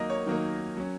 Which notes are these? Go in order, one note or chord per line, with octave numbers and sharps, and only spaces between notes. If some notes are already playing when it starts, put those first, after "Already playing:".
Already playing: D#3 F#3 A#3 D#4 D#5
C#5
D#3 F#3 A#3 D#4
F#3 C#4